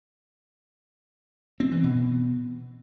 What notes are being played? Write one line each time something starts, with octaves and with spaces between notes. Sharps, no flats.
C4
E3
B2